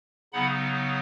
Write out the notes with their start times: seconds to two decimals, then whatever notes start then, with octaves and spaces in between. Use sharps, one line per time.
0.33 C#3 F#3 B3 D#4 F#5 B5